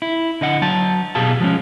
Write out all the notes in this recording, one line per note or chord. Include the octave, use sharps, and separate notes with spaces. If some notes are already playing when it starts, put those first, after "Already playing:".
E4
D3 D#5 F#5
F#3 A5
B2 G4 G#4 F5 A5
F3 G#3 C#4